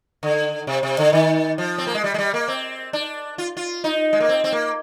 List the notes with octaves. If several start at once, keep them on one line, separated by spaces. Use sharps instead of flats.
D3
C3
C3
D3
D#3
F3
C4
A#3
G#3
G3
G#3
G3
A#3
C4
D4
F4
F4
D#4
G#3
A#3
C4
C4
A#3